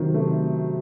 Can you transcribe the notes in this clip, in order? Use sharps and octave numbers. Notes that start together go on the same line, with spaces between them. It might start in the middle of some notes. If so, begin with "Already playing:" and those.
Already playing: C3 D#3 F#3
A3